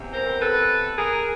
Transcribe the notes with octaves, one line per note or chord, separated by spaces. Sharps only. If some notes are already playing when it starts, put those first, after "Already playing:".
Already playing: E2 C3 E3
A#4 C5
A4 B4
G#4 A#4